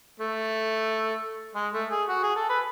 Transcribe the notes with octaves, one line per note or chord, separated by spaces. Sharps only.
A3
G#3
A3
G#4
F#4
G#4
A4
B4